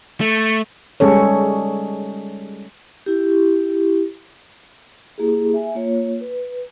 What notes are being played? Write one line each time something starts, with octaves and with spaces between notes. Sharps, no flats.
A3
G3 G#3 C#4 A4 C#5
E4 G4
A#3 E4 G4 G#4
E5 G#5
A#3 F4 C#5
B4